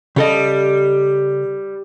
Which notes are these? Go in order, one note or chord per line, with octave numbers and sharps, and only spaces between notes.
C#3 G3 A4 D#5